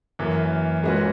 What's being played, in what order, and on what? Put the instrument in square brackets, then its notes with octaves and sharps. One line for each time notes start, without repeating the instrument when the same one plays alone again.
[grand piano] F#2 E3 A#3
A#2 G#3 C#4 F#4 B4